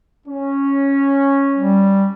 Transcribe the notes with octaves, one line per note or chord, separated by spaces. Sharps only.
C#4
G3